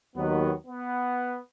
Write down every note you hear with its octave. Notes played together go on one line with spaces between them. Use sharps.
D#2 D#3 F#3 B3
B3